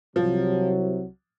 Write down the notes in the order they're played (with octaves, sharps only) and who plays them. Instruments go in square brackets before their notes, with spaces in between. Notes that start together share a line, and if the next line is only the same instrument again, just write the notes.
[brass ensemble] C2 C3 F#3 [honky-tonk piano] F3